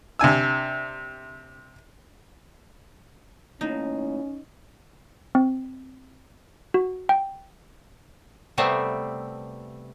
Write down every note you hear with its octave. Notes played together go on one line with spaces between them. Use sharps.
C3 D4 G#5 E6
D#2 A2 C#4 D#4
C4
F#4
G5
C3 G3 A3 B3 C4